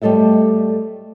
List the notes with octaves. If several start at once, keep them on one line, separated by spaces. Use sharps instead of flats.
G3 A3 A4 D#5 E5